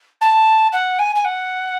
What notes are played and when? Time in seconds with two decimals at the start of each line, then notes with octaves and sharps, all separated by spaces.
0.21 A5
0.72 F#5
0.99 G#5
1.15 G#5
1.24 F#5